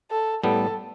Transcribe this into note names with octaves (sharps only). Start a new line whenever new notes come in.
A4
A2 G3 B3 A4